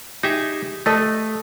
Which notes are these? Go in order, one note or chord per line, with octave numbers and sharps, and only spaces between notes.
D#4 G4 G#4 E5
A3 A4 D#5